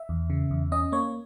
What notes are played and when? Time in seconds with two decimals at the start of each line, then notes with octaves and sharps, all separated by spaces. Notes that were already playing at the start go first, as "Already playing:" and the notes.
Already playing: E5
0.09 E2
0.30 C#3
0.51 E2
0.72 C#4 D#5
0.92 A#3 C#5